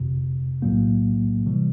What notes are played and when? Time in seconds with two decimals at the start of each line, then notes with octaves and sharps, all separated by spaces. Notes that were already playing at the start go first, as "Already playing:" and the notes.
Already playing: G1 F2 C3
0.62 B1 A2 F#3 A#3
1.46 C3 E3 G3